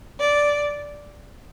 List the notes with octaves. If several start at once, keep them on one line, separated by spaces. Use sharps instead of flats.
D5